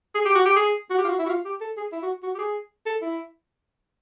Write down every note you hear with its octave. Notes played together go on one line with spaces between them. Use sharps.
G#4
G4
F#4
G4
G#4
F#4
G4
F4
F#4
E4
F#4
F4
G4
A4
G#4
E4
F#4
F#4
G4
G#4
A4
E4